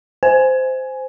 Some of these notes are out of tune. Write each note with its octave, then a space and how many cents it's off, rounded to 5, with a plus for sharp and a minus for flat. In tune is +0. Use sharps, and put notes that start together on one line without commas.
C5 -10 G#5 +0